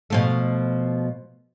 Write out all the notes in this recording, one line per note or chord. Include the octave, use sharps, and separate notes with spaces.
B2 F3 A3